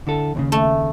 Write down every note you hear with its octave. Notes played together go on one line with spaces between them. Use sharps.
D3 E4 A4
D#2 A#2 C#3
A3